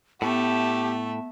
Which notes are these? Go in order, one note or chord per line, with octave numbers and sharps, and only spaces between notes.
A2 A3 B3 G4 E5 A5